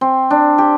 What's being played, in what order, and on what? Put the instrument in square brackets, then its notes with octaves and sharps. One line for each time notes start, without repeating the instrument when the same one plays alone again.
[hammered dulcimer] C4
D4
G4